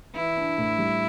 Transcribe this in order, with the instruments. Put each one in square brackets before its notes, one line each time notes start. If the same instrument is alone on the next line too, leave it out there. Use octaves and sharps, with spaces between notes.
[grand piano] E3 [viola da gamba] E4
[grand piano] D4
A2
G3